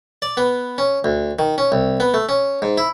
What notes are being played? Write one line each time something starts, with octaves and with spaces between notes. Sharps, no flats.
D5
B3
C#4
D2
D#3
C#4
C2
B3
A3
C#4
G#2
E4